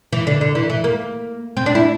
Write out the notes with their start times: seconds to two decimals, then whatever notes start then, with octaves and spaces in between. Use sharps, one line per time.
0.12 E3
0.27 D3
0.41 D3
0.55 E3
0.70 E3
0.84 A#3
1.57 C4
1.66 D4
1.75 E4